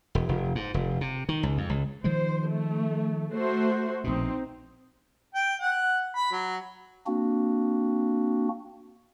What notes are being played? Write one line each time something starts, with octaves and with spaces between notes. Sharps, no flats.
E1
F1
G#2
F1
C3
D#3
C#2
F2
C#2
D#3 F3 G#3 C5
A3
A3 F#4 C5
A#1 B2 C4 D#4
G5
F#5
B5
F#3
A#3 C4 D4 F#4